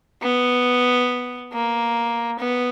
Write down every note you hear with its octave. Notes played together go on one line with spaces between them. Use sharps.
B3
A#3
B3